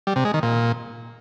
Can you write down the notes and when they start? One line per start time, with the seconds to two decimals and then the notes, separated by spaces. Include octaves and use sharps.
0.07 G3
0.16 C3
0.25 G#3
0.34 D#3
0.43 A#2